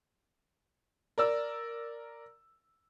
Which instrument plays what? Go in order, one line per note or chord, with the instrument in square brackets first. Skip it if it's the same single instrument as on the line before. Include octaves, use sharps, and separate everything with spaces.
[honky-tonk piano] A#4 D5 E6